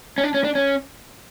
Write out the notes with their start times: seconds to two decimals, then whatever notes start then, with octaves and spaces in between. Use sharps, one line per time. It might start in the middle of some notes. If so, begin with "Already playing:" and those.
0.18 C#4
0.23 D4
0.34 C#4
0.44 D4
0.55 C#4